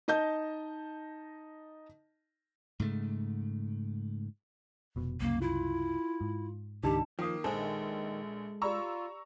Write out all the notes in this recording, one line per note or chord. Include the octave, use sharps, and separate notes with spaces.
D#4 D#5 A5 G6
G#2 C#3 A3
F1 B2
C2 F#2 C#3 A#3
E4 F4
G#2
C#2 G#2 D#3 D4 D#4 G4 A5
D#3 F3 A#3 G5 D#6
A#1 D#3 G#3 D4 A4 C5 G#5
F4 G4 D5 A#5 B5 C#6 E6